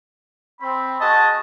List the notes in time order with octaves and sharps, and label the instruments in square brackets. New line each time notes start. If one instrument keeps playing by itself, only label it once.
[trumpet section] C4 [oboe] B5
[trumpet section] F#4 G#4 D#5 [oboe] A5